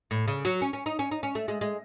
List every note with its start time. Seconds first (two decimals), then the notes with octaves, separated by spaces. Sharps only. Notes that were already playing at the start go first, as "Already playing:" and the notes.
0.11 A2
0.28 C#3
0.45 F#3
0.62 C#4
0.73 C#4
0.86 D#4
0.99 C#4
1.11 D#4
1.23 C#4
1.35 A3
1.48 G#3
1.61 G#3